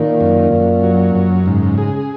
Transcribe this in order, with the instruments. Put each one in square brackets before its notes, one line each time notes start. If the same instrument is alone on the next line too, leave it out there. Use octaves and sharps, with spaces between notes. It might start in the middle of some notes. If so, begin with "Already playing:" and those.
Already playing: [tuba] A#2 [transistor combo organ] D#3
[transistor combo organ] F#2
F#2
F#3
F#2
[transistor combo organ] G#2 [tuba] C#3
[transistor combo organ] G#4